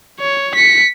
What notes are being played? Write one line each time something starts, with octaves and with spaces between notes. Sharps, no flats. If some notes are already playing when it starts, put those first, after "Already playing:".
C#5
B6 C#7